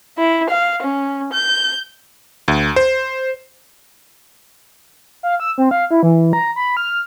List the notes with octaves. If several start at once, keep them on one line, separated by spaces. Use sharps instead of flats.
E4
F5
C#4
G6
D2
C5
F5
E6
C4
F5
E4
E3
A#5
B5
F6